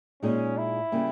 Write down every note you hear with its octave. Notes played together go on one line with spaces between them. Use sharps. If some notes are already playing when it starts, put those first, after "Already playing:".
A#2 G#3 C#4 D#4 G#4 D#5
E4
C#3 G3 A#3